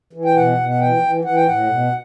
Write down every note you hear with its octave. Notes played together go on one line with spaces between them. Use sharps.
E3
G5
B2 F#5
B2
F#5
E3 G5
E3
E3 F#5
G5
A2 F#5
B2